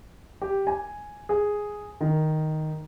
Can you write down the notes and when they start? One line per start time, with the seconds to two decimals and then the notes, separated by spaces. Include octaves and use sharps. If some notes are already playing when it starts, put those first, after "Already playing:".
0.42 G4
0.67 G#5
1.29 G#4
2.01 D#3